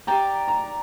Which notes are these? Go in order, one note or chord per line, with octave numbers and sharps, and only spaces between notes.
G4 D5 G5 A#5
A#5